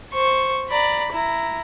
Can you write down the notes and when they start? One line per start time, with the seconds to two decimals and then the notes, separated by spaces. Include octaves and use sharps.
0.13 C5 C#6
0.69 D5 A#5 B5
1.13 E4 A#5